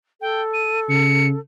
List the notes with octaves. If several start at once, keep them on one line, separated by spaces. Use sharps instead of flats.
A4 G5
D#7
C#3 C#7